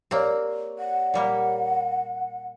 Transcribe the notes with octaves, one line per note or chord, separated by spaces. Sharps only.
A#3 C4 G4 C#5 D5
F#5
A#2 G3 A#3